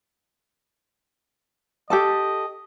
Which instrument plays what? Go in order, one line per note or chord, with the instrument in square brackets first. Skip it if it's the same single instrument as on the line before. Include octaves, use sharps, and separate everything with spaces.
[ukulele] G4 A4 A5 [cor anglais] D#5